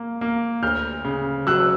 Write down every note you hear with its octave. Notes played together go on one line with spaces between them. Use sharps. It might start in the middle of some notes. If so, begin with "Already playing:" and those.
Already playing: A#3
A#3
D2 F6 G6
C#3
F#3 E6 F#6